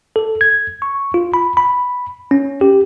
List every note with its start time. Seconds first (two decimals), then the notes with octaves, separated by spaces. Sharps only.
0.16 A4
0.41 G#6
0.82 C#6
1.14 F4
1.34 B5
1.57 B5
2.31 C#4
2.61 G4